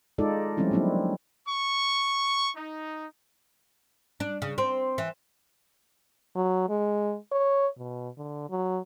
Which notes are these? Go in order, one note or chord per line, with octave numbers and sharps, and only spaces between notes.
G#3 D#4 F4 A4 D5
F3 G3 G#3 C4 C#4 E4
F#3 A#3 C4 D4 E4
C#6
D#4
D4
C#3
C4
E3
F#3
G#3
C#5
B2
D3
F#3